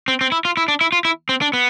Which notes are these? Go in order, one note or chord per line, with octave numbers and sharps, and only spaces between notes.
C4
C4
E4
F4
E4
D4
E4
F4
E4
C4
D4
B3